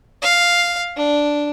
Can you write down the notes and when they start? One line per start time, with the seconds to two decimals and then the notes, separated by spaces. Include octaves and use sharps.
0.22 F5
0.97 D4